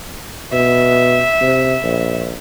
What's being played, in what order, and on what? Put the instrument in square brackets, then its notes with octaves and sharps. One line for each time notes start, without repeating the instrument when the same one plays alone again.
[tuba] B2 [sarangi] E5
[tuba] C3
A#1